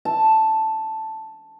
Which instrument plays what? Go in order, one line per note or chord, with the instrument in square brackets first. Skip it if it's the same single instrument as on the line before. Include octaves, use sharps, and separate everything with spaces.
[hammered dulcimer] A5